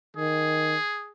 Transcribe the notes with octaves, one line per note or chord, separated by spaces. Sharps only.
D#3 G#4